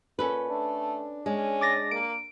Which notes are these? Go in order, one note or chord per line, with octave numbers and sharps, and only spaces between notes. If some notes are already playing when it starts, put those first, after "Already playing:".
A#2 C#4 A4 B4
A3 D4
G#3 C#4
D6 A6 A#6
A#3 D7